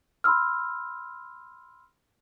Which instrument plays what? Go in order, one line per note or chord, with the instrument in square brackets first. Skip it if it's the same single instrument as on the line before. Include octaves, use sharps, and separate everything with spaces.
[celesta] B5 C6 E6 F6